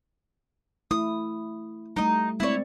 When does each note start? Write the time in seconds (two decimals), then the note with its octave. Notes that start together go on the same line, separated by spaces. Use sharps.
0.91 A3 E4 D#6
1.96 G3 A3 D#4 D#5
2.40 G#3 C4 E4 C#5 D5